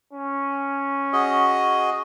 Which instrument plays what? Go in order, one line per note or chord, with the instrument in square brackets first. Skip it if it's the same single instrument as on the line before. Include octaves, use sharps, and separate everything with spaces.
[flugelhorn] C#4
[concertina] F#4 G#4 D#5